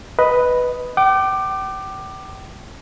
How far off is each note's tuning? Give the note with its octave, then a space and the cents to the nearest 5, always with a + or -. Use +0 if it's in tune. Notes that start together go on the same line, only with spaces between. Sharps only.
B4 +0 D#5 +0
G5 -40 D6 +15